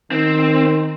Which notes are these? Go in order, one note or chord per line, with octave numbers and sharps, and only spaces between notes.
D#3 C4